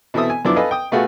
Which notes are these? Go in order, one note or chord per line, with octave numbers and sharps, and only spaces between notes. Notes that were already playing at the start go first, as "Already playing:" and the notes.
B2 E3 C4 A4 E5 D#6
G#5
F#2 F3 B3 D4 E4 D6
A4 B4 D#5 F5 G#5
G5 D#6
B2 A3 B3 F4 F#4 G#4